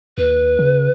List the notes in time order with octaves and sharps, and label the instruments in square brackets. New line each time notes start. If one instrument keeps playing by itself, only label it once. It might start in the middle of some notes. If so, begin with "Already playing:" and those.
[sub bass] D#2 [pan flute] B4
[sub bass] C#3